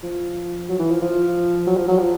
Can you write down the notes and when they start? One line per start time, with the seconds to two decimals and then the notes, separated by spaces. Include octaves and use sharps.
0.03 F3
0.69 F#3
0.79 E3
0.91 F3
1.02 F3
1.67 F#3
1.77 F3
1.88 F#3
1.99 F3